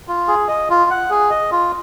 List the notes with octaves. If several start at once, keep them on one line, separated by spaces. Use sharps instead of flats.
F4
G#4
D#5
F4
F#5
G#4
D#5
F4